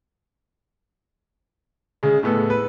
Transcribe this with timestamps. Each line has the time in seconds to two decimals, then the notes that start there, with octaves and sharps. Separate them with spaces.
2.03 C#3 G#3
2.23 A2 G#3 B3 A4
2.50 B4